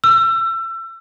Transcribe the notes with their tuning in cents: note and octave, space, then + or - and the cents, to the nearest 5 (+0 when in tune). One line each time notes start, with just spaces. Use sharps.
E6 +30